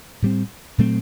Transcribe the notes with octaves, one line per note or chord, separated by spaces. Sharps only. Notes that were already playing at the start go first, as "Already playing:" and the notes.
A2 G3 C4
A#2 F#3 A3 C4